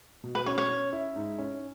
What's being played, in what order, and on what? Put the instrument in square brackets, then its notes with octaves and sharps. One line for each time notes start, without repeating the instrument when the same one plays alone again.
[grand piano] B2
[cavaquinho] B4
[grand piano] C#4 [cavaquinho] C#5
[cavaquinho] C#5
[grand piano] C#4
E4
G#2
C#4